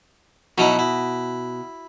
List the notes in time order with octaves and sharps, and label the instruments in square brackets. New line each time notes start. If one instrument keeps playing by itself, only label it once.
[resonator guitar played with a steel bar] B2 [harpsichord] F#3 D#4 E4
[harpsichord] E4